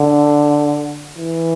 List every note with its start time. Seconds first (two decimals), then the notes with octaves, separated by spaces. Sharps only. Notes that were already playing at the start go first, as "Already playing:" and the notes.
Already playing: D3
1.18 E3